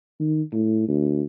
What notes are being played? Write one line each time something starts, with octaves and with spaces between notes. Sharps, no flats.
D#3
A2
D2